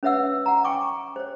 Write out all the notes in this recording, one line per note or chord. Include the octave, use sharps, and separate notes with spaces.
C#4 B4 C#5 E5 F#5 E6
F#5 A#5
G5 G#5 C#6 D6
C5 C#5